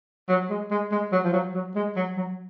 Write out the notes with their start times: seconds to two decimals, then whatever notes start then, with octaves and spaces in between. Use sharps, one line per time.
0.29 F#3
0.50 G#3
0.71 G#3
0.92 G#3
1.12 F#3
1.24 F3
1.33 F#3
1.54 F#3
1.75 G#3
1.96 F#3
2.17 F#3